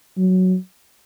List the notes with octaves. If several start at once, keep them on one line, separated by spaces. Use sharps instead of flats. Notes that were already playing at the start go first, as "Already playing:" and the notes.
F#3